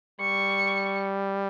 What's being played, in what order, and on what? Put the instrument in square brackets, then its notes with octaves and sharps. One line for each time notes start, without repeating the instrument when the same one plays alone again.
[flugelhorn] G3 [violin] C#6